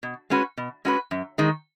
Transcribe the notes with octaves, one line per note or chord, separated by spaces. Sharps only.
B2
G#3 C#4 F#4 B4
B2
G#3 C#4 F#4 B4
F#2
D#3 G#3